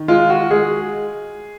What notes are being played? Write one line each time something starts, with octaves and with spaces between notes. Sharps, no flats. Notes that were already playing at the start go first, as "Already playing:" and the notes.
Already playing: D#3
G#3 F4
F#4
G#3 G#4